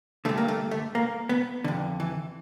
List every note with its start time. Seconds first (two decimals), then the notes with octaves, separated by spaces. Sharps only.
0.25 D3 A3
0.29 G2
0.37 A#3
0.48 A3
0.71 A3
0.95 A#3
1.29 B3
1.64 F2 D3
2.00 E3